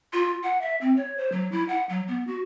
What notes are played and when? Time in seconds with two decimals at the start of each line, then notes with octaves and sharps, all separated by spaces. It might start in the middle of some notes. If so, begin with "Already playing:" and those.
0.13 F4
0.43 F#5
0.61 E5
0.81 C4
0.96 C#5
1.17 C5
1.32 F#3
1.52 E4
1.68 F#5
1.89 F#3
2.08 B3
2.27 F#4